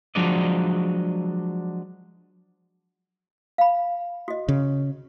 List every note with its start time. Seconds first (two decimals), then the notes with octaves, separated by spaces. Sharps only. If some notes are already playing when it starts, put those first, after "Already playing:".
0.15 F3 F#3 G#3 D4 D5 D#5
3.58 F5 B5
4.28 F#4 D#5
4.49 C#3